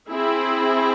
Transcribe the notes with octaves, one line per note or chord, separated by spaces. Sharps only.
C4 E4 G#4